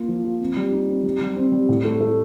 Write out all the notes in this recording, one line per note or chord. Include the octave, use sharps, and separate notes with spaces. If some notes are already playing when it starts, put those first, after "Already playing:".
Already playing: A#3 F4
F3
F4
C4
G3
D#4
C4
G3
G3
C4
G3
A2
A3
A3